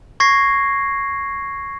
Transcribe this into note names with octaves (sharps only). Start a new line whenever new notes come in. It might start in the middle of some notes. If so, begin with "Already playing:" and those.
C#6 G#6 A#6 C7